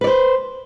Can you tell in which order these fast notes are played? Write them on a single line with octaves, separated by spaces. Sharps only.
B4 D5 C5